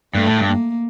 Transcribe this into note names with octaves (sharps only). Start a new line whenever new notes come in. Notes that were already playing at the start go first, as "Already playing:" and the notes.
G2 A3
A2
G2
A#3